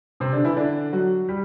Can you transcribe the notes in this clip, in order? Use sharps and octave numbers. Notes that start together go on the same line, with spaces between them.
C3 C4
D3 D4
E3 E4
D3 D4
F#3 F#4
G3 G4